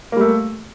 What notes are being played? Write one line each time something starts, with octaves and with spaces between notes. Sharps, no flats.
G3 A3 A#3